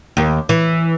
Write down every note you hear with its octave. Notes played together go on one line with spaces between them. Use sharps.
D#2
E3